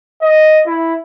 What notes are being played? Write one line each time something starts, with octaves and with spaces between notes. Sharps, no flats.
D#5
E4